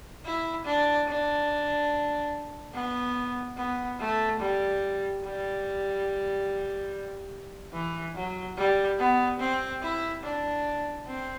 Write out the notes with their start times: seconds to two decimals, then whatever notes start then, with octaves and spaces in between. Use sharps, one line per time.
0.25 E4
0.66 D4
1.08 D4
2.74 B3
3.57 B3
3.99 A3
4.40 G3
5.24 G3
7.73 E3
8.15 F#3
8.57 G3
8.99 B3
9.40 C4
9.82 E4
10.23 D4
11.07 C4